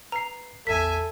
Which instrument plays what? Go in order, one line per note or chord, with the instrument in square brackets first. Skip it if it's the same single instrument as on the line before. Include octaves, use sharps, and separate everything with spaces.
[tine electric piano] B4 C7 [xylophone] A#5
[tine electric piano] A1 E2 [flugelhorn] A4 [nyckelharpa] E5 G#5 [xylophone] B6